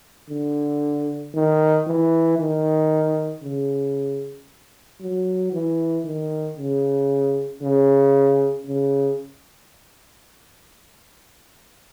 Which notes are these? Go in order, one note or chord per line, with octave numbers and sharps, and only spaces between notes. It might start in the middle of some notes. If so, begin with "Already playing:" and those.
D3
D#3
E3
D#3
C#3
F#3
E3
D#3
C#3
C#3
C#3